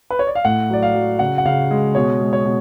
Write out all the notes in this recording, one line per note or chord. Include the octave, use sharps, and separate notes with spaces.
B4
C#5
D5
F5
A2 F#5
F#3 D5
F5
F#3
C#3 F#5
F#5
C#3 F5
G#3
B2 C#5
G#3
C#5
B2